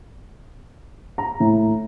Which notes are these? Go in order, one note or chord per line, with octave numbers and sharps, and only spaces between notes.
A#5
A2